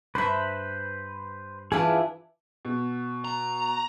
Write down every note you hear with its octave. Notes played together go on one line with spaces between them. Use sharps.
G2 B4 C5 E5 B5
E3 D4 E4 F4 G#4 B5
B2
A#5